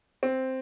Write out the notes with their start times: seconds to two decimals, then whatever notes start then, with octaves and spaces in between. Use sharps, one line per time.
0.23 C4